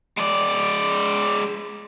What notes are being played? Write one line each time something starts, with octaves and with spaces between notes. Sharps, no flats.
G#3 D5